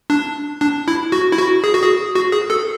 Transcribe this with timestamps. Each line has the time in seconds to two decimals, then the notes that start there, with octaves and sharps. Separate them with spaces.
0.10 D4
0.61 D4
0.88 E4
1.12 F#4
1.32 E4
1.38 F#4
1.64 G#4
1.74 F#4
1.82 G#4
2.15 F#4
2.32 G#4
2.50 A4